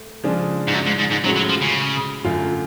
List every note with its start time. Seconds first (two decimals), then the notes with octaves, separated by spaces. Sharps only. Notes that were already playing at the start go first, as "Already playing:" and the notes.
Already playing: A3
0.24 C#3 F3 G#3 D4
0.68 G#2
0.74 F#2
0.86 G#2
0.99 G#2
1.11 G#2
1.23 A2 F#3 G#3 C#4 F#4
1.36 F#3
1.49 F3
1.61 C#3
2.24 F#2 D3 F#3 A3 F4